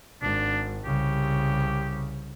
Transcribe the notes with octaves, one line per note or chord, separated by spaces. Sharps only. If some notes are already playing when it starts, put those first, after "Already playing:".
G#1 D4
C2 C#3 G4